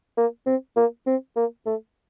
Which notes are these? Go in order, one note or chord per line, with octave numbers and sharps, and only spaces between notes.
A#3
C4
A#3
C4
A#3
A3